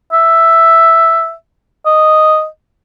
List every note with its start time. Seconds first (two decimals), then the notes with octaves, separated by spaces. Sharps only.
0.13 E5
1.86 D#5